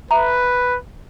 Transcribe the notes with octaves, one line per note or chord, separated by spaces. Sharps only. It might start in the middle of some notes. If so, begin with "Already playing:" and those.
B4 E5 A#5